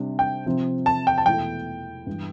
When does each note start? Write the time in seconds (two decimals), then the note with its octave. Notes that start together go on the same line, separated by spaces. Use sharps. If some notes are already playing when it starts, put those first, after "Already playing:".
Already playing: C3 G3 D4
0.19 G5
0.46 C3 F3 C4
0.86 A5
1.07 G5
1.18 A5
1.26 E2 B2 A3 E4 A4 G5
2.06 G2 E3 G3